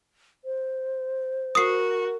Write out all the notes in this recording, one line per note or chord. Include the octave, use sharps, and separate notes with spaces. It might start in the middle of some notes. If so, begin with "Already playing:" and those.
C5
F#4 A#4 D#6 C7